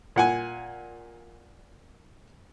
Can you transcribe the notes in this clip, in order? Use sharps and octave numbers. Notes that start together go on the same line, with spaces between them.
A#2 F#5 G#5